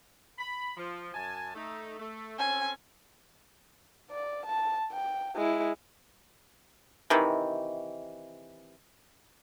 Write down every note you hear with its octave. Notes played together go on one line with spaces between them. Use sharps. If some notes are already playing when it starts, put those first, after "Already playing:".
B5
F3
F#2 G#5 A5
A3 D#4
A3
C4 C#4 A4 G#5
D5
A5
G5
G#3 E4
C3 D#3 E3